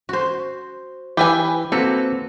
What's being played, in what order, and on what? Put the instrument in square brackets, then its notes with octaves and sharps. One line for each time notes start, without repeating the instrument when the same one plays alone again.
[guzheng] F#4 C5
[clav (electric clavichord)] E3 [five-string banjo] G4 B4 G#5
[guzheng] A#3 B4 [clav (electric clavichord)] C4 F#4 [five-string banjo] A4